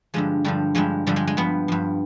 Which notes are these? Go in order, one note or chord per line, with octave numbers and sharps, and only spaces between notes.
G2 D3 F3 G#3
G2 D3 F3 G3
G2 D3 F3 G#3
G2 D3 F3 G3
G#3
G#3
G2 F3 B3
G2 F3